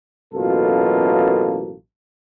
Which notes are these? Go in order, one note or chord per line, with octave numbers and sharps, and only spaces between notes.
A1 F#2 B2 A#3 F4 A4